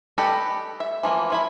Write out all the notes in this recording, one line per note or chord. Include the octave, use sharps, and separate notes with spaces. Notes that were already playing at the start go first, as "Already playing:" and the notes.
G4 A4 B4 D5 D#5
E5
E3 F3 A#3
F3 E4 B5